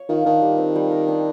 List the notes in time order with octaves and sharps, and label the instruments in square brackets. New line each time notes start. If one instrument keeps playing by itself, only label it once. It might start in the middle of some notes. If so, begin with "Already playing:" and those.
Already playing: [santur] C#5
[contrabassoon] D#3 [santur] F4
[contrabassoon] D#3 [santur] D4
[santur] G3
C4
G3
A#4
D4